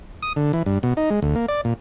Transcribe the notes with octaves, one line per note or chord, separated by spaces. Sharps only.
D#6
D3
E3
G2
B2
D#4
G#3
D2
A#3
D5
A#2